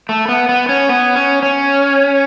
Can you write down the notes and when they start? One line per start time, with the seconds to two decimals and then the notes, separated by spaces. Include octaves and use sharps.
0.09 A3
0.29 B3
0.49 B3
0.69 C#4
0.89 B3
1.16 C#4
1.43 C#4